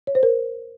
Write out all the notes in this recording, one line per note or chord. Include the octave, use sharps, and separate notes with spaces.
C#5
C5
A#4